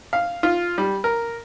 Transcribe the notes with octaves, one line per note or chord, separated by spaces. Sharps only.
F5
F4
G3
A#4